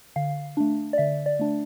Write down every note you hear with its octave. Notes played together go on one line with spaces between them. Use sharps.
D3 F5
A3 D4
D5
D3 E5
D5
A3 D4